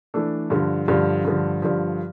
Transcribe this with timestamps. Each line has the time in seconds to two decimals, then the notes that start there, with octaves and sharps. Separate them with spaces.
0.14 E3 A3 D4 A4
0.50 G2 D3 F3
0.88 G2 D3 F3
1.25 G2 D3 F3
1.62 G2 D3 F3